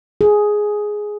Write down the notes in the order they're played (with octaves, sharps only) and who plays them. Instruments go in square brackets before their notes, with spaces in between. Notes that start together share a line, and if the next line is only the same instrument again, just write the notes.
[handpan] G#4